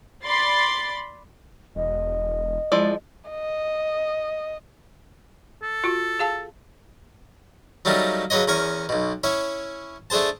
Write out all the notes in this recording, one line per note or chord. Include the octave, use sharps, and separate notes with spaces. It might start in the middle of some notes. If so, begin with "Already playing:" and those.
D5 B5 C6 A6 C7
E1 D#5
F3 G#3 E4 D5
D#5
A4
F4 F#4
G#4 F5 A5
F#3 G3 A3 A#3 C#4 D#4
C#3 F#3 B4 C#5 D#5
E2 C#4 A#4 G#5 C#6
B1 B2
C#4 E4 C#5
A3 D4 G#4 C5 A5